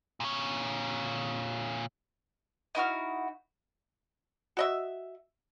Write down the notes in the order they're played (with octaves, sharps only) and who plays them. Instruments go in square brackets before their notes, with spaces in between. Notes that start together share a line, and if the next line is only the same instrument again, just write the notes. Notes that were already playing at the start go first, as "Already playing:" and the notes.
[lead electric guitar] A#2 C#5
[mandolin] D#4 E4 F#4 F6
[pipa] F#4 D#5 E5